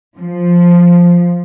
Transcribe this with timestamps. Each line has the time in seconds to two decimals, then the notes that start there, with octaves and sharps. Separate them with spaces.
0.17 F3